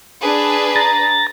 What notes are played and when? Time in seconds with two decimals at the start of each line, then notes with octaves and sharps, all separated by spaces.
0.21 D4 G#4 B4
0.76 A#5 A6